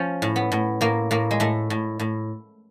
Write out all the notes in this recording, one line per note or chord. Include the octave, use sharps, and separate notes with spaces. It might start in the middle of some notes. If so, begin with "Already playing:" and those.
Already playing: F3 C#4
A2
B3
A2
A2 A#3
A2 A#3
G#3
A2 A3
A2
A2